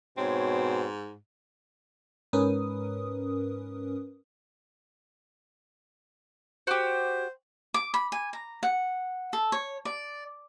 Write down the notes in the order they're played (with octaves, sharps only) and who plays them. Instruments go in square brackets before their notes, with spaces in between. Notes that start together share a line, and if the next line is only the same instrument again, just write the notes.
[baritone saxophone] G#2 [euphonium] B2 [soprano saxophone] C4 [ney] C#5
[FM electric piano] G#2 C#4 A#4 B4 D#6
[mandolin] F#4 G4 [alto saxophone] C5
[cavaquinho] D6
B5
G#5
A#5
F#5
A4
C#5
D5